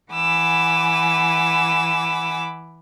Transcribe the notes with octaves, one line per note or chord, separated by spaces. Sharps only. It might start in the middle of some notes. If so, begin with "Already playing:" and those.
E3 F#5 G#5 B5 D6 E6